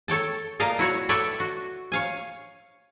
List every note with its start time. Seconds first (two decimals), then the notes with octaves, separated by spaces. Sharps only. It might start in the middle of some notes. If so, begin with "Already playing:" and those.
0.08 A4 C#5 G5 A5
0.60 A#2 A#4 D#5 F5 A5
0.79 E4 F#4 C#5
1.09 A4 B4 C#5 D5 E5 G5
1.40 F#4
1.92 C#5 F5 G#5